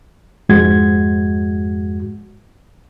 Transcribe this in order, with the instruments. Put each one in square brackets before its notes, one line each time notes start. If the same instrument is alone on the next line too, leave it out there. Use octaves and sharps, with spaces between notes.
[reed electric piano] F2 G#2 G#3 F#4 G#6